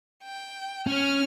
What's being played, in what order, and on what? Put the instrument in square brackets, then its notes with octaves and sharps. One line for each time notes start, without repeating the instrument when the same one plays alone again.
[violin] G5
[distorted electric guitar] C#4 [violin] C#5 F6